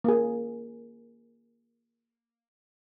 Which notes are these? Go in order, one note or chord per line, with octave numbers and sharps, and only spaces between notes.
A#3 G#4